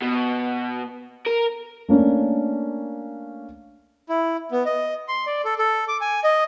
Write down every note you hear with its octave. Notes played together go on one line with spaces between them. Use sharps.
B2
A#4
A3 A#3 C#4 D4
E4
B3
D#5
C6
D5
A4
A4
D6
G#5
D#5